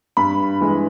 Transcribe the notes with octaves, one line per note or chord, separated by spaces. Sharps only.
G2 B5
E3 G#3